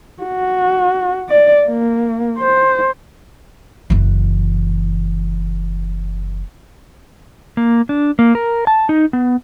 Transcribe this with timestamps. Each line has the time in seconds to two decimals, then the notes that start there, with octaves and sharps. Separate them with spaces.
0.23 F#4
1.29 D5
1.67 A#3
2.38 C5
3.90 F#1 E3
7.57 A#3
7.89 D4
8.19 A#3
8.35 A#4
8.67 A5
8.89 D#4
9.13 B3